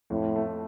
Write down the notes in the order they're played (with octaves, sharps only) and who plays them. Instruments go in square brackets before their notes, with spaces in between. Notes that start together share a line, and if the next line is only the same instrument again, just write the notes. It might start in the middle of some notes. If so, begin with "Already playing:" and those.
[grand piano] F2 [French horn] A2
[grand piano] A3